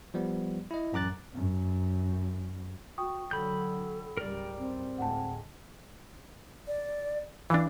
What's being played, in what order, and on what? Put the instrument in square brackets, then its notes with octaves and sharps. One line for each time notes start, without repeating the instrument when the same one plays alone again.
[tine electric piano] F3 G3 B3
E4 D#5
A1 F#2 A#5 D6 F#6 A6
[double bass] F#2
[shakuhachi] F#4 [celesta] G5 C#6 D#6
[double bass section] D3 F#3 [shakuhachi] A4 [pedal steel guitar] B5 G6
[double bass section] C#2 G#2 G3 [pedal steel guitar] A#4 D5
[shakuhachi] C4
[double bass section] D2 A2 G#3 [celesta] F#5 G5 A5
[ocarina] D5
[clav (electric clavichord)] E3 D4 [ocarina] F5